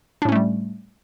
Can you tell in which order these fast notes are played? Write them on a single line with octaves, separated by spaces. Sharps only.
D4 A2 C#4 A3 G3